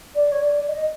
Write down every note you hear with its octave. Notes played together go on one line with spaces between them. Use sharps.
D5
C#5
D5
D#5